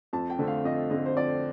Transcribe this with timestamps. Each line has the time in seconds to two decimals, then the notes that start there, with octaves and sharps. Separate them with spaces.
0.13 F2 A5
0.30 G5
0.39 D3 A3 C4
0.47 F5
0.64 F2 D#5
0.90 D3 A3 C4 D#5
1.06 C5
1.17 F2 D5